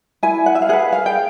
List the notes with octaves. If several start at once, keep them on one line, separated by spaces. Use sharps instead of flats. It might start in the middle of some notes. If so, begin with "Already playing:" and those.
E4 G#5
F#5
E5
F5
G#4 B4 F#5
F5
G5